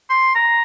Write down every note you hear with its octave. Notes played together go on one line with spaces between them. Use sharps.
C6
A#5